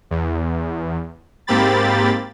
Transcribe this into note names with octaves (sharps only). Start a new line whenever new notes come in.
E2
G#2 A#3 C4 G4 B5 A6